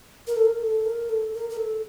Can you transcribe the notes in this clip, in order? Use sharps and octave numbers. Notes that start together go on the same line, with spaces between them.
A#4
A4
A#4
A4
A#4
A4
A#4
A#4
A4